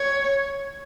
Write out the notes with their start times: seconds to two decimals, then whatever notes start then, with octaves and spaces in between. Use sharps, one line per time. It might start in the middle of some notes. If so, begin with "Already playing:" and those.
Already playing: C#5